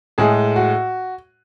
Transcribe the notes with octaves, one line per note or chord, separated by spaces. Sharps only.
A2 G#3 G#4
F#4